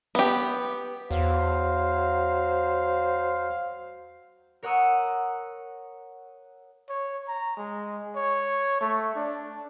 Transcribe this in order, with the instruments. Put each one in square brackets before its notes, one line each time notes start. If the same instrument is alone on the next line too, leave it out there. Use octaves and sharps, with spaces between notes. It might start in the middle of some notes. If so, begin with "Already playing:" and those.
[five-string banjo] B3 G4
[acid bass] E2 [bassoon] F#3 [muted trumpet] C5 [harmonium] F5
[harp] A#4 C#5 F#5 C#6 D#6 E6
[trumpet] C#5
A#5
G#3
C#5
A3
D4